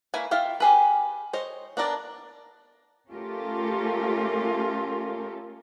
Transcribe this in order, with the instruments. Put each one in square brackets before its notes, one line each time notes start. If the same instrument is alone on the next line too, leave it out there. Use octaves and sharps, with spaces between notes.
[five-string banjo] A#3 E4 B4 C#5 G#5
E4 F4 F5 G5
G4 G#4 B4
C5 C#5 D#5
B3 D4 A#4 D5
[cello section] A3 C#4 F4 G4 A4 A#4